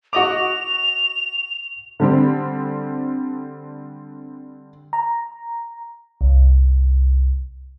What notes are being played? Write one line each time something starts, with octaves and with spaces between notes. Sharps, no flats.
F#4 D#5 D6 F7
D3 G3 C4
A#5
C2